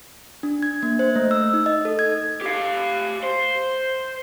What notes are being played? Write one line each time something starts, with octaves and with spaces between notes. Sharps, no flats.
D4
G#6
A#3
C5
A3
E6
D#4
D#5
A4
G#6
G4 F5
C5